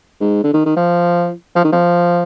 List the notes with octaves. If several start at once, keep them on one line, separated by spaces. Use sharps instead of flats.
G#2
D3
D#3
D#3
F3
F3
D#3
F3